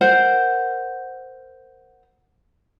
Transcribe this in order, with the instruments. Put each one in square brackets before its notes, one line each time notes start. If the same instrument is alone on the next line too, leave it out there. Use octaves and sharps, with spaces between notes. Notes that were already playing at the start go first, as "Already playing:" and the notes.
[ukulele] A#4 C5 F#5